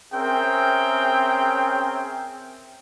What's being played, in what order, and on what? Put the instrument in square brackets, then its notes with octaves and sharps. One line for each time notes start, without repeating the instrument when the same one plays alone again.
[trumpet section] C4 C#4 G#4 A#4 E5 G5